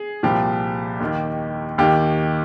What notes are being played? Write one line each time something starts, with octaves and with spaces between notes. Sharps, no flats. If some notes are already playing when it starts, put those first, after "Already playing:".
Already playing: G#4
C2 A#2 F3 G4
D#2 D#3
D#2 D#3 G4